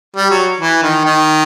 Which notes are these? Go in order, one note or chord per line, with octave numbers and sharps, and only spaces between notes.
G3
F#3
E3
D#3
D#3